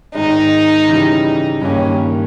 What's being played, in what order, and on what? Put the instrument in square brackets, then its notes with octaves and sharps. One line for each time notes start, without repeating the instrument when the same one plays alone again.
[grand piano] G#2 D#3 G#3 [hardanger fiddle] D#4
[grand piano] C#3 E3 G3
[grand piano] G2 D#3 A#3 [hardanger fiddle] C#4